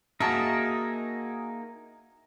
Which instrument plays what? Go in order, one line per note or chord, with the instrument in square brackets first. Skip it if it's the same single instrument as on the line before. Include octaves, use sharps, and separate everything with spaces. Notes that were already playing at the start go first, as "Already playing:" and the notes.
[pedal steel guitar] A#3 D#4 [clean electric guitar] F#4 G#4 A#4 [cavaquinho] E5 A5